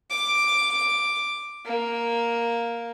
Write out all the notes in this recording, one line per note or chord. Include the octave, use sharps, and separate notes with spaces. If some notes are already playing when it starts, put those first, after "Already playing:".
D6
A#3